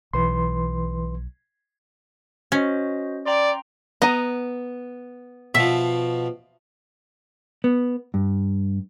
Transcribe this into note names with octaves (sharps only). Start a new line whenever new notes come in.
B1 E3 B4 C6
C#4 F#4 C5 D#5
D5 G5 A#5 C6
B3 D#5 A#5
B2 F3 E5
B3
G2